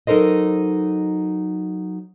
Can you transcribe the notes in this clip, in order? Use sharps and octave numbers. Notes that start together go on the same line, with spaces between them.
F#3 D#4 A4 A#4 C5 D#5